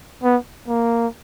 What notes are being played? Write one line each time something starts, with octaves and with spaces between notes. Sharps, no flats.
B3
A#3